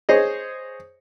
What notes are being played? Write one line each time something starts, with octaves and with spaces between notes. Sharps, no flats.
G#4 C5 C#5 D#5